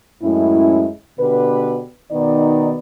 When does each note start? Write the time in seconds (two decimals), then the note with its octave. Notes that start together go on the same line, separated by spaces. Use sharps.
0.23 F#2 A2 G#3 C#4 E4
1.19 B2 D3 G4 B4
2.11 B2 D#3 B3 D#4 D5